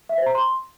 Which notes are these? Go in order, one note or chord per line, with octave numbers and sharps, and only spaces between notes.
E5
C5
A#5
C6